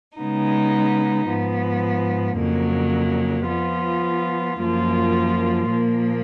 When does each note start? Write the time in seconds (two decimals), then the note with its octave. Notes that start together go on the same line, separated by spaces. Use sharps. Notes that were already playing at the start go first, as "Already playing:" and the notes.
0.17 C#3 G#3 B3 D#4
1.28 G#2 F3 B3
2.38 F2 C#3 F#3 A#3
3.48 F3 B3 F4
4.59 F#2 F3 A#3 F4
5.69 A#2 F3 A#3